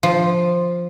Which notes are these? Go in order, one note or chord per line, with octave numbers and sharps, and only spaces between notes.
F3